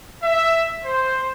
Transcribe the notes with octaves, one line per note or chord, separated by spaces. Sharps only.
E5
C5